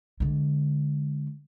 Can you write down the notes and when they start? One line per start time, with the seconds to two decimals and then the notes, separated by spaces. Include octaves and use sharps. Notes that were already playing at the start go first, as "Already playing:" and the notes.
0.20 D3 G#3